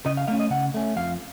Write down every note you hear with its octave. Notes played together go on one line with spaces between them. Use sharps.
C#3 D#5
F5
A3 C#4 F5
D#5
C#3 F#5
A3 C#4
F2 F5